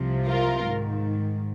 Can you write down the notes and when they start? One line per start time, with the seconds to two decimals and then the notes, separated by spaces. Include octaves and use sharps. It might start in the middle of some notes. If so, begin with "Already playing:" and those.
Already playing: C2 C3 F3
0.27 F4 A#4
0.66 G#2 D#3